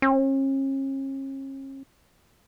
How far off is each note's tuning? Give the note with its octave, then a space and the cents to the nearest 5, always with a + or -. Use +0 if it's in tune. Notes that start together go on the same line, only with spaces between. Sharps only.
C#4 -40